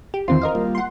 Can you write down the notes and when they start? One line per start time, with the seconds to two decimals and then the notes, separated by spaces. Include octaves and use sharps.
0.14 G4
0.28 E2 D#3 C4 F4 C5 C6
0.42 A#4 D#5 F5
0.55 G3 A#3 F4
0.75 F#5 C6